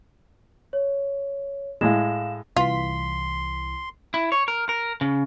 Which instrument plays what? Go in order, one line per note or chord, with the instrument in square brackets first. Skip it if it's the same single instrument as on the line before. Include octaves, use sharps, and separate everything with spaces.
[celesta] C#5
[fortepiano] A2 G#3 [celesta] F5 E7
[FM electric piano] C2 E3 B6 [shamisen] F4 [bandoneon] C6
[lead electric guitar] E4
C#5
A#4
A#4
C#3